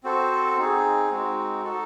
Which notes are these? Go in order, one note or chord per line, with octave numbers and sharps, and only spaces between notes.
C4 F#4 A4 C5
C4 D#4 G#4
G#3 C4 D#4 F#4
D#4 F#4 A4